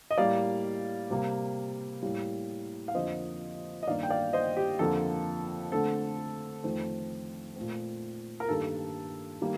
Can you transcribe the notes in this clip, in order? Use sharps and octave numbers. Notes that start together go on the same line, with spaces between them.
D#5
A2 G3 A#3 D5 F5
C3 G3 A#3
A2 G3 A#3
F5
F2 D3 F3 A#3 C5 D#5
D#5
G2 D#3 A#3 D5 F5
G5
D5 F5
C5 D#5
G4
F2 D3 F3 A#3 A4
D3 A3 C4 A4
F2 D#3 A3 C4
A#2 A3 C4
A#4
G2 D#3 G3 A#3 A4
D#3 G3 A#3